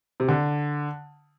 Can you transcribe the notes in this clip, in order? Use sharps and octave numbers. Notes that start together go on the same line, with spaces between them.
C3
D3